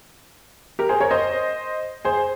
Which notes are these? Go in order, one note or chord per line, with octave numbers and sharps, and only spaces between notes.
G4 A#4
G#4 C5
A#4 C#5
C5 D#5
G#4 C5